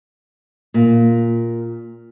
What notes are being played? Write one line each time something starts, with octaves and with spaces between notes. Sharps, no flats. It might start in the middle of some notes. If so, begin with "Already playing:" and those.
A#2